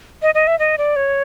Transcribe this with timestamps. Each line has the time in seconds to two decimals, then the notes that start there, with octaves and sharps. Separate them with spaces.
0.22 D#5
0.35 D#5
0.47 E5
0.59 D#5
0.78 D5
0.96 C#5